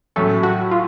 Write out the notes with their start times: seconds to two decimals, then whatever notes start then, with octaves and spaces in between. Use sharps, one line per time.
0.16 A2 F#3 A3 C#4 A4
0.43 F#4
0.71 F4